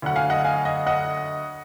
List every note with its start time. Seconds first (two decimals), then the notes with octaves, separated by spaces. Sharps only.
0.02 D2 D3 F#3 F#5
0.16 F5 G#5
0.30 D#5 F#5
0.45 F5 G#5
0.65 D#5 F#5
0.87 D#5 F#5